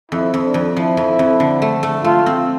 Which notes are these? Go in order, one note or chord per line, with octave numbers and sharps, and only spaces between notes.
F2 E4
F2
D4
F2
F3 E4
F2
F2
D3
A3
A3
A3 F4
C4